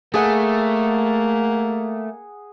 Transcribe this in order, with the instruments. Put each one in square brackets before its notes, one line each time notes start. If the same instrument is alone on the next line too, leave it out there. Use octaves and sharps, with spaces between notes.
[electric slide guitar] A3 [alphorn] A#3 [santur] G#4 F#5